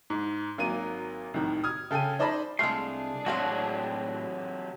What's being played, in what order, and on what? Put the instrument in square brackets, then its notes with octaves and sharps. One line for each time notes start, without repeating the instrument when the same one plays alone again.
[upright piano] G#2
G#1 F#3 A#3 D#7
C2 A2 D#3
D#6 F6 G#6
C#3 A4 G5 G#5 D#7
D#4 C5 D5 D#5 A5 B5
[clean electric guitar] C2 F5 C6 [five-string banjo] G#3 A3 [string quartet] D4 G#4
[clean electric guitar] A2 F#4 [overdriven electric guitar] C3 F#3 [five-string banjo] G#3 C4 F5